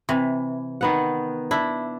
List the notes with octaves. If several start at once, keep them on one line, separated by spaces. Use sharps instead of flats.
C3 E3
D#3 B3 F#5
D4 E4